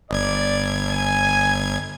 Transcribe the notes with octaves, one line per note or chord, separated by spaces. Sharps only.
G1 D5 G#6
G#5